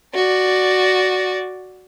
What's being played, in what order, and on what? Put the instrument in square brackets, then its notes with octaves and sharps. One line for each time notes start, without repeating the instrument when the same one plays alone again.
[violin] F#4 D5